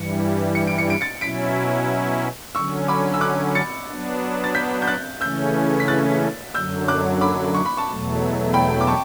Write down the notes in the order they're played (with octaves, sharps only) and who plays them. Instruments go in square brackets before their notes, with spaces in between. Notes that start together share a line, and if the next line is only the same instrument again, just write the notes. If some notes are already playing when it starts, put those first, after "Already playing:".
Already playing: [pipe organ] G2 E3 G3 [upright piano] C#7
[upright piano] C#7
D7
C#7
D7
A6 C#7
[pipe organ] B2 F#3 C#4 E4 [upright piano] B6 D7
[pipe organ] D3 F#3 C#4 [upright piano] C#6 E6
[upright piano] B5 D6
E6
D6 F#6
A6 C#7
[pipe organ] F#3 B3 D4
[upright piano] A6
G6 B6
G6
F#6 A6
[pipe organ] C#3 E3 A3 C#4 [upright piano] E6 G6
[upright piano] B6
F#6 A6
[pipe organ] F#2 D3 F#3 [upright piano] E6 G6
[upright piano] D6 F#6
B5 D6
C#6
B5
A5 C#6
[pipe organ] E2 B2 F#3 A3
[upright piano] G5 B5
D6
A5 C#6